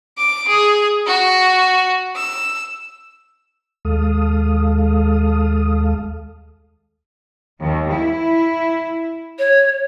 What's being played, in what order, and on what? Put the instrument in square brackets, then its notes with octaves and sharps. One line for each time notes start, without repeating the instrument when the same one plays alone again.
[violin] D6
G#4
F#4
E6
[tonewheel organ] D#2 G#3 A4 F5 D#6
[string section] D#2
E4
[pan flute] C#5